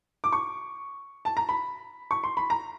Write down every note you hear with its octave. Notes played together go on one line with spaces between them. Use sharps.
D6
C#6
A5
A#5
B5
C#6
C6
B5
A#5